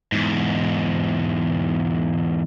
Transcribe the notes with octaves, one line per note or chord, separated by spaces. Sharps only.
E2 G#2